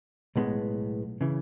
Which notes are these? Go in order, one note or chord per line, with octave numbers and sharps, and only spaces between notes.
B1 A2 G#3 B3
C#3 E3